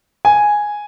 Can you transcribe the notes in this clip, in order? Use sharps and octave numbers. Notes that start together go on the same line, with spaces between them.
G#5